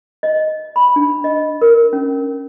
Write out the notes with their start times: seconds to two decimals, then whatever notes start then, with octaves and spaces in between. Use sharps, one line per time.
0.23 D#5
0.76 B5
0.96 D4
1.24 D#5
1.62 A#4
1.93 C#4